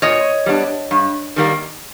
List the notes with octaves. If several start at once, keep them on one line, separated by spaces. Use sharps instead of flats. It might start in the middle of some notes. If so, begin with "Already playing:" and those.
A#2 C#5 D#5
G3 B3 D4
G2
D#3 G3 A#3